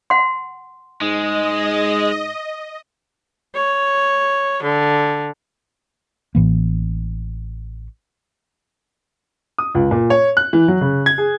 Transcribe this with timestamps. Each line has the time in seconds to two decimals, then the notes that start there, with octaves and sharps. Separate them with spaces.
0.10 F#5 C6
1.01 G#2 G#3 D#5
3.55 C#5
4.63 D3
6.35 A1 A2 E3 A#3
9.58 D#6
9.75 C#2
9.91 A#2
10.10 C#5
10.37 F#6
10.53 E3
10.68 F#3
10.81 C#3
11.06 G#6
11.18 G#4